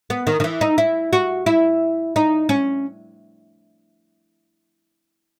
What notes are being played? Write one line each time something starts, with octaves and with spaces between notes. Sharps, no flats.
B3
D#3
D#3
E3
D#4
E4
F#4
E4
D#4
C#4